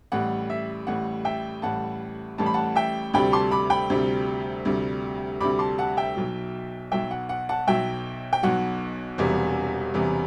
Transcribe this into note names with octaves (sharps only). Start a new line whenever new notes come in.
A1 A2 G3 F#5
E5
A1 A2 G3 F#5
E5 G5
A1 A2 G3 F#5 A5
A1 A2 G3 A5
B5
F#5 A5
E5 G5
D2 C3 G3 G5 B5
A5 C6
B5 D6
G5 B5
D2 C3 G3
D2 C3 G3
D2 C3 G3 B5 D6
A5 C6
F#5 A5
E5 G5
B1 B2 F#3
B1 B2 F#3 E5 G5
F#5
F#5
F#5 A5
B1 B2 F#3 E5 G5
G5
B1 B2 F#3 F#5
E1 E2 C3 G3
E1 E2 C3 G3